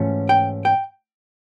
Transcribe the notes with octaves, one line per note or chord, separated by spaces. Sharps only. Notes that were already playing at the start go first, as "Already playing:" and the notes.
Already playing: G#2 E3 A3 C#4 F4
G5
G5